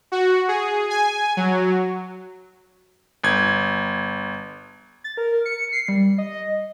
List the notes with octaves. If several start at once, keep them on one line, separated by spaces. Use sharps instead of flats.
F#4
G#4
G#5
F#3
G1 G#6
A6
A#4
C#7
C7
G3
D#5